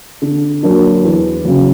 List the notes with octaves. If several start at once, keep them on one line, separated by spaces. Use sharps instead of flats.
D3
F#3 A#3 D4
E2
C#3 F#3